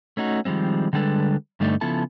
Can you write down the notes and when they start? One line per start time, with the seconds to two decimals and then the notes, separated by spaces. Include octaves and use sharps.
0.17 A3 C#4 D#4 F4 F#4
0.45 D#3 F3 G3 G#3 C4
0.93 D3 G3 G#3 D4 A4 B4
1.60 G2 D3 A3 D#4
1.81 C#3 F3 B3 E4 A4 A5